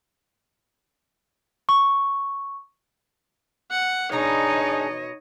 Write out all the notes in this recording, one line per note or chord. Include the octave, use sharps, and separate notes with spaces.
C#6
F#5
B2 D4 D#4 G#4 C#5 D#5 A#5